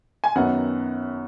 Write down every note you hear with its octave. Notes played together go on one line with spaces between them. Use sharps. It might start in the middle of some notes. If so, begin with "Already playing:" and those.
G#5
F#2 D#3 B3 F#5